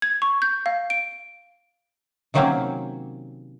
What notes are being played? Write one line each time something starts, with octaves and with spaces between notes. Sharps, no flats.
G#6
C#6
G6
F5
D7
C3 D#3 F#3 A#3 C4 C#4